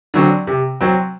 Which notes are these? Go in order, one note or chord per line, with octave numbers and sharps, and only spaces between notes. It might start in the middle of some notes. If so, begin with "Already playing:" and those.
D3 F#3 C4
C3
F#3 C4